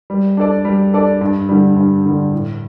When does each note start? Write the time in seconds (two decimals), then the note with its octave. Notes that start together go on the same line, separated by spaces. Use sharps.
0.10 G3
0.37 D4 A4 D5
0.65 G3
0.94 D4 A4 D5
1.21 G2
1.49 D3 G3
1.76 G2
2.05 D3 G3
2.32 A2